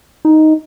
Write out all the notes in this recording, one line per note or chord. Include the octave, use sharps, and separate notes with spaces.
D#4